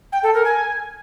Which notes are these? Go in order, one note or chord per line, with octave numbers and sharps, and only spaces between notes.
G5
A4
A#4
G#5